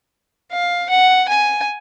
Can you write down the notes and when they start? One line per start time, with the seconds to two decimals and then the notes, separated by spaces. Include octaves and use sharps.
0.52 F5
0.89 F#5
1.29 G#5